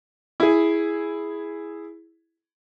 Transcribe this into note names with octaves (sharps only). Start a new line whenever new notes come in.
E4 G#4